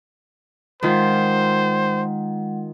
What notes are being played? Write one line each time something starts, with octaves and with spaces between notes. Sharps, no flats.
D#3 G#3 F4 C5 F#5